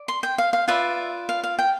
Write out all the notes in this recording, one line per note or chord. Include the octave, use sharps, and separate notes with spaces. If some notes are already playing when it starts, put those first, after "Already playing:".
Already playing: D5
C6
G5
F5
F5
F4 B4 D5 E5
F5
F5
G5